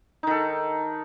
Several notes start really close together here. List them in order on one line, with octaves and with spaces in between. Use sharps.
D#4 D#3 A4